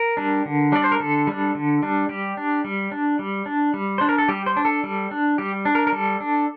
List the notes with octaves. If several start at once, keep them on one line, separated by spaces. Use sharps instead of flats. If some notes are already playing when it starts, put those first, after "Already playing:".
Already playing: A#4
G3 D4
D3
G3 D4 D5
C5
A#4
D3 A4
G3 D4
D3
G3 D4
G3 G4
D4
G3
D4
G3
D4
G3
D4 C5
A#4
A4
G3 G4
C5
D4
A4
G3
D4
G3 G4
D4
A#4
A#4
G3 A4
D4